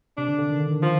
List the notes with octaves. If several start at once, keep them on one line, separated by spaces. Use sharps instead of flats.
C3 D4
D3
D3
D#3
D3
D#3
F3